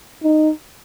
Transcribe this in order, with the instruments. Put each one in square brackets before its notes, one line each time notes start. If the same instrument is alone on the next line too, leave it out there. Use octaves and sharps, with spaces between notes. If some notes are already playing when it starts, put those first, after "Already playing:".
[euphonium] D#4